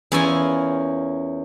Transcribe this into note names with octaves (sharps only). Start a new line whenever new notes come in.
E2 C#4 E4 F4 A#4 G#5